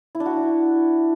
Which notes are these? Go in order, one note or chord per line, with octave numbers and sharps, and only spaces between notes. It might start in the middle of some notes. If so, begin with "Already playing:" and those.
E4
D4
F#4